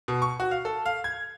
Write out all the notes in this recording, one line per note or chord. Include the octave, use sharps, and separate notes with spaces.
B2
C#6
F#4
F5
A4
F5
G#6